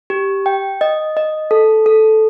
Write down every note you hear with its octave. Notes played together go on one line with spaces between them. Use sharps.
G4
G5
D#5
D#5
A4
A4